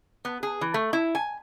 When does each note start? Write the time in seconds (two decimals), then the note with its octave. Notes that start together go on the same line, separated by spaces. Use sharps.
0.25 B3
0.43 G#4
0.61 E3
0.74 A3
0.93 E4
1.15 G#5